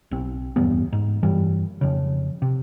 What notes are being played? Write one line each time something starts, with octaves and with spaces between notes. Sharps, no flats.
B1 C4
D1 E2 G2 B3
G#2
F1 G2 E3 G3
F2 C#3
C3